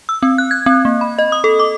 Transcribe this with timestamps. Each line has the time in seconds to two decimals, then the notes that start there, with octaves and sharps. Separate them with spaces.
0.09 E6
0.22 C4
0.38 F#6
0.51 G#6
0.66 C4
0.85 A#3
1.01 B5
1.19 D#5
1.32 D#6
1.44 A4
1.59 D6